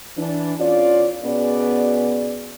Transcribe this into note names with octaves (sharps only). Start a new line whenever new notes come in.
E3 D4
E2 C#4 F4 D5
B2 B3 C#4 G#4 D5